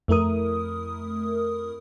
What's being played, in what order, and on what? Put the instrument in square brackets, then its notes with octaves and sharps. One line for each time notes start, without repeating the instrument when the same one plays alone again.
[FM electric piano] F2 A3 E4 A#4 D#6